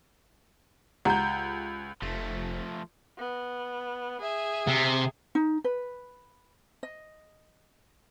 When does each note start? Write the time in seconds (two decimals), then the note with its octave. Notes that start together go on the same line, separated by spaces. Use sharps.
1.05 C#2 G4 F#5 A#5 G6
2.02 F1 F3 A3
3.18 B3
4.21 G#4 E5
4.68 C3
5.35 D#4
5.64 B4
6.83 D#5